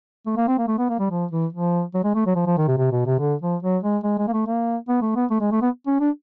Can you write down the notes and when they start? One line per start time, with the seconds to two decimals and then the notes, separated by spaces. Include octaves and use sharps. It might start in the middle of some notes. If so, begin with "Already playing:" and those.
0.26 A3
0.37 A#3
0.48 C4
0.58 A#3
0.68 A3
0.78 B3
0.89 A#3
0.99 G3
1.11 F3
1.31 E3
1.53 F3
1.94 F#3
2.04 G#3
2.15 A3
2.26 F#3
2.36 F3
2.46 F3
2.58 D#3
2.68 C3
2.78 C3
2.92 B2
3.06 C3
3.20 D3
3.41 F3
3.63 F#3
3.83 G#3
4.04 G#3
4.18 G#3
4.28 A#3
4.33 A3
4.47 A#3
4.88 B3
5.02 A3
5.16 B3
5.30 A3
5.41 G#3
5.52 A3
5.62 B3
5.87 C#4
6.00 D4